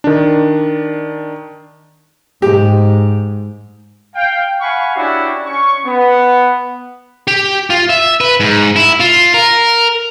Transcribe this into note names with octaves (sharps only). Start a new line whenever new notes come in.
D#3 D4
G#2 G4
F5 G5
F5 F#5 G#5 B5 C#6
C#4 D4 E4 F#4 G4
C#4 C#6
B3
G4
F4
E5
B4
G#2
E4
F4
A#4